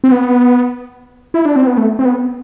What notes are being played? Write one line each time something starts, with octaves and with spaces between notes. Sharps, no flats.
C4
B3
E4
D4
C4
B3
A3
C4
B3